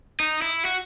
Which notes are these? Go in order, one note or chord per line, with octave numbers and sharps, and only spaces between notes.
D#4
E4
F#4